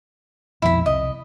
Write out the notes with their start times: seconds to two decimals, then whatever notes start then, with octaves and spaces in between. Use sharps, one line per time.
0.62 A#1 F2 B2 E4 B5
0.86 C2 D#5